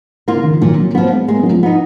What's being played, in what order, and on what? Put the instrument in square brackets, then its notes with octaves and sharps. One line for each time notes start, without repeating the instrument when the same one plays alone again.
[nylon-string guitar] A#3 F4
[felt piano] C#3
D#3
F3
[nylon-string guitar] A#2 [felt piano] D#3 F#3
[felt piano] F#3 A#3
[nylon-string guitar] F3 B3 [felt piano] F#3 A#3
[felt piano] G#3 B3
[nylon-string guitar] G#3 [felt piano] A#3
[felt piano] B3
F#3 A#3
F3 G#3
[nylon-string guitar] B3 D#4